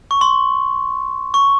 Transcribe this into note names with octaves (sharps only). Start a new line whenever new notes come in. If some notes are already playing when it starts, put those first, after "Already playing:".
C#6
C6
C#6